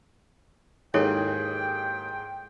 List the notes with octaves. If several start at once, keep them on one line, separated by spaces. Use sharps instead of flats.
D#2 G#2 E4 G#4 A4 C#5 G5